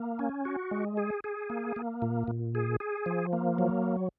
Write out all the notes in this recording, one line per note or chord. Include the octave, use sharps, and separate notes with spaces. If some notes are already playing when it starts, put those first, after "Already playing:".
Already playing: A#3
C#4
F#4
G#3
G#4
G#4
A#3
A#3
A#2
A#2
G#4
G#4
F3
A#3
F#3